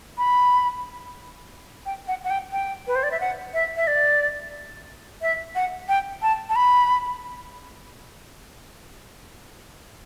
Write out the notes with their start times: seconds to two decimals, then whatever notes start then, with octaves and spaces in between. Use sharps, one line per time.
0.18 B5
1.86 G5
2.08 F#5
2.24 F#5
2.30 G5
2.52 G5
2.87 B4
2.95 C5
3.03 D5
3.11 E5
3.20 F#5
3.54 E5
3.77 E5
3.87 D5
5.22 E5
5.55 F#5
5.89 G5
6.22 A5
6.49 A5
6.56 B5